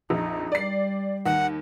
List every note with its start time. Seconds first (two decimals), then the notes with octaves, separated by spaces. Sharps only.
0.10 A#1 F2 D#4
0.52 G3 D5 C7
1.26 D#2 F#5